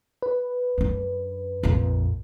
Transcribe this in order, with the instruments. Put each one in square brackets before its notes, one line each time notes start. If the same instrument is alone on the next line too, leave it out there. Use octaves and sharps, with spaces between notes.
[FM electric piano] B4
[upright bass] F#2 D4
A#1 F2